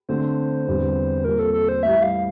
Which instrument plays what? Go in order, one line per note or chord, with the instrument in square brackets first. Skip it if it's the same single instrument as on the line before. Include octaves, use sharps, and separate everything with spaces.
[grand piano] D3 A3 C4 [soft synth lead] C5
[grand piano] E2 D3 G3 C4
[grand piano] A#2 G3 C4 [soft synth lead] A#4
[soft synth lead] A4
A4
C5
[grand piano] A2 E3 G3 [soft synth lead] E5
[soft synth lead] F5